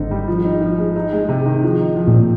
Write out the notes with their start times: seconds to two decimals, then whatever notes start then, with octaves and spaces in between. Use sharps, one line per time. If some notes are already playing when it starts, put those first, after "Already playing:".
Already playing: G#1 G#2 D3 C4 D#4
0.11 G3
0.28 F3
0.45 D#4
0.62 F3
0.78 G#3
0.96 D#4
1.13 G#3
1.29 C3
1.46 D#3
1.63 F3
1.80 D#4
1.96 F3
2.07 A#2
2.14 C4